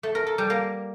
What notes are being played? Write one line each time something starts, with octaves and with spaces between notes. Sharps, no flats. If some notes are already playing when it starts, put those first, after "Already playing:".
A3
A#4
A4
G3
A#3